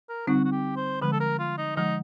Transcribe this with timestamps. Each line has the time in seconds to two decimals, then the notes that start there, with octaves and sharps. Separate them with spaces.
0.09 A#4
0.27 D3 G3 C4 D#4 F#4
0.44 F#4
0.51 G4
0.76 C5
1.01 D3 F3 G#3 B4
1.12 A4
1.20 A#4
1.39 F4
1.57 D#4
1.76 D3 F3 G#3 D#4